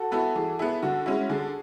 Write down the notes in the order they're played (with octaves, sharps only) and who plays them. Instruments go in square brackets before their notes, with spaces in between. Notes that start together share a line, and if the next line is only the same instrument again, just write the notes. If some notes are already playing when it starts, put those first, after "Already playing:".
Already playing: [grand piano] F#4 A4
[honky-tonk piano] B3 E4 [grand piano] F#4 A4
[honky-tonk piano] E3 [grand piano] G#4
[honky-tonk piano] B3 E4 [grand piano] G#4
[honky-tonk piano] D3 [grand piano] F#4
[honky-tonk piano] G#3 C#4 E4 [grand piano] F#4
[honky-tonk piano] D3 [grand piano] G#4